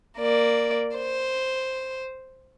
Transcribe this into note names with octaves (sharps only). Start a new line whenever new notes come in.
A#3 D5
C5